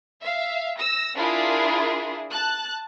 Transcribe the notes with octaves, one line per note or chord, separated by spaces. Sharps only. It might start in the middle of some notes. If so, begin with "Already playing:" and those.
E5 F5
E6 A#6
D4 E4 F4 G#4 A#4
A5 F#6